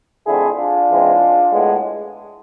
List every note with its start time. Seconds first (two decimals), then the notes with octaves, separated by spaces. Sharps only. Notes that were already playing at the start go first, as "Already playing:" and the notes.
0.26 F2 D3 A3 C4 E4 G#4
0.58 D4 F4
0.89 G#2 E3 G#3 C4
1.52 A2 G#3 B3